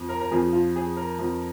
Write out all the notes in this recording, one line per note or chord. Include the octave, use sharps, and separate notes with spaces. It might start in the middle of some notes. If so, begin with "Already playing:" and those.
Already playing: F2 F3
A#4
A#4
F2 F3 G#4
F4
G#4
A#4
F2 F3